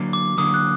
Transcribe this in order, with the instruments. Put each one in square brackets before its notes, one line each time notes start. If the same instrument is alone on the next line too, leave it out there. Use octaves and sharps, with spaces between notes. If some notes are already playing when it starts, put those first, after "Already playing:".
Already playing: [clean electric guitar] D3 F#3 A#3
[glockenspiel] D6
[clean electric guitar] D3 F#3 A#3 [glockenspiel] D#6
[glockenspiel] F#6